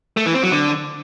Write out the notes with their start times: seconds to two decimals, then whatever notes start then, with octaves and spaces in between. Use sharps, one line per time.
0.17 A3
0.26 E3
0.34 C4
0.43 F#3
0.52 D3